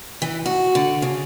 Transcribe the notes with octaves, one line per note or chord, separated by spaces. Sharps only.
E3
F#4
D3
C#3